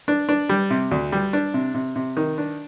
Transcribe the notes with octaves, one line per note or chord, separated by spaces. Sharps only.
D4
D4
G3
C3
D2
G3
D4
C3
C3
C3
D#3
D4